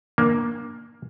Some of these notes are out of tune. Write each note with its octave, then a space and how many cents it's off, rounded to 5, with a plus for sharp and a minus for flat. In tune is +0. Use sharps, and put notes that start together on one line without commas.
A#3 +10 D4 +0